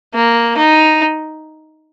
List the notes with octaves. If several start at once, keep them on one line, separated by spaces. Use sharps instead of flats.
A#3
D#4